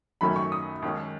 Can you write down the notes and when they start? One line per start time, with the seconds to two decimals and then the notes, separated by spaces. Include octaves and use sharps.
0.21 F#2 D#3 F#3 A3 C#4 B5
0.36 C#6
0.52 D#6
0.82 D#2 D#3 G#3 C#4